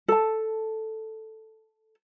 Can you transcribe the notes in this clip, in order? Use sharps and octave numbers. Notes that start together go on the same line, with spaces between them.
A4 A5